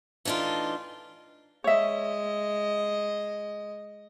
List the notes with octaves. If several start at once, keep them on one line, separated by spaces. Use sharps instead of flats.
E3 A3 D4 D#4 F4
G#3 C#5 D#5 E5